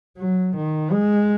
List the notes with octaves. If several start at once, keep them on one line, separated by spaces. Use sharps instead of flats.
F#3
D#3
G#3